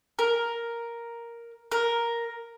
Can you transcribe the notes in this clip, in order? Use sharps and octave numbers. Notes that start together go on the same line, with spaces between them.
A#4
A#4